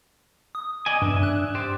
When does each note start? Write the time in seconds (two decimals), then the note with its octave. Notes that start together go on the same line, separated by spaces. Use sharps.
0.55 D#6
0.86 D5 D#5 G#5
1.02 G2 D4 E5
1.23 F#6
1.55 G4 C5 D5